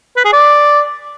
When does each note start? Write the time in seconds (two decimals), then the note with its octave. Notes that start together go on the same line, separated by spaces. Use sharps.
0.16 B4
0.25 G#4
0.33 D5